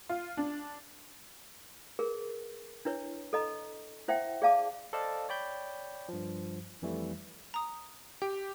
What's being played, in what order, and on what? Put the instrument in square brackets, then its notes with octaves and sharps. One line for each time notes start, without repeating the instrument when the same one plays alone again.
[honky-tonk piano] F4
D4
[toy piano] G#4 A#4 B4
D4 E4 B4 C#5
A4 D#5 A#5
E4 C5 E5 F#5 G5
G#4 D5 F5 A5 D6
[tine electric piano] A4 C5 D5 D#5 F5 A5
C#5 D5 G5 B5 G6
G2 F3
F2 E3 G3 A3
[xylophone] A#5 D#6
[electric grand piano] G4 [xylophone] G5